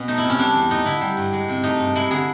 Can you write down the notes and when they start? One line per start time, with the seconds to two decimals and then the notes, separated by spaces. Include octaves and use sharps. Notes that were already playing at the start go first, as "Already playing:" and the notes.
Already playing: B2 B3 C#4
0.08 A3 D#4
0.18 E4
0.24 C3
0.29 C#4
0.39 G3 D4
0.55 E2
0.70 A3 D#4
0.86 D3 E4
1.01 G3
1.17 G2
1.33 G#3
1.48 C3
1.63 A3 D#4
1.80 G2
1.95 G#3 E4
2.11 D3 G#4